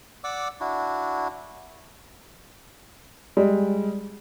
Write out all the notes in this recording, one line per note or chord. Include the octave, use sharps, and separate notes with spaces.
D5 F#5 D6 E6
D4 E4 F#4
G3 G#3